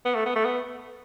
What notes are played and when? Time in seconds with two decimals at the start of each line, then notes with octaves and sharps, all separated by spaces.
0.05 B3
0.15 A3
0.26 B3
0.35 A3
0.45 B3